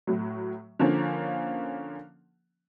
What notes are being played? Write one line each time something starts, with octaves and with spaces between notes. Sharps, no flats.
A2 F#3
D3 F3 A#3 C#4